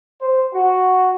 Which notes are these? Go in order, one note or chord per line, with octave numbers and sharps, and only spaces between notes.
C5
F#4